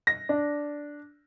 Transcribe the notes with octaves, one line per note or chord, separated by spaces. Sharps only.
A#6
D4